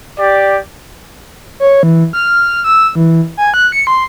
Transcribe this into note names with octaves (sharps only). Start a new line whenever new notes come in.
G4 D5
C#5
E3
F6
E6
E3
G#5
F#6
C#7
C6